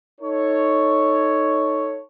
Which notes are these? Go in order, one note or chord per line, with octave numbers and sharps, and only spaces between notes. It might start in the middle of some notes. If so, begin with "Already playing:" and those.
D#4 A4 C#5